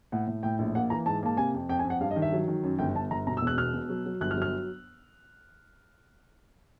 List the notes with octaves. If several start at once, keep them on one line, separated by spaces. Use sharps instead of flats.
A2 F#5
A2
A2 G5
A#1
A#3 F#5
E3 A#5
G#2 A5
A#3 A5
C3 G#5
F2
F2 G5
G#5
F2
F#5
G2 F5
D#5
D#3
E5
F#3
D#3
F#2
G1 G5
G1 A5
G1 A#5
B2 A#5
E6
E1
F#6
B2 F6
B2
F#3
F#3
G1 F#6
F6
F#3
F6